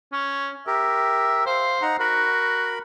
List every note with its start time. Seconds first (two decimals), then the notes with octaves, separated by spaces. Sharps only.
0.13 C#4
0.67 G4 A#4 E5
1.46 C5 F5
1.82 D#4 F#5 A#5
2.00 F#4 A#4 B5